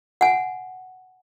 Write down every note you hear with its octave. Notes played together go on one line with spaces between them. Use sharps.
F#5 G#5